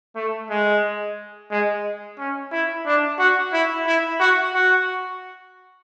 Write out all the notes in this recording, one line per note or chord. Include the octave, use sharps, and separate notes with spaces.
A3
G#3
G#3
C#4
E4
D4
F#4
E4
E4
F#4
F#4